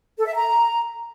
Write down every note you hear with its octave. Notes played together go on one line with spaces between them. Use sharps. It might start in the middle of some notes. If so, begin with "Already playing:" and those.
A4
E5
A#5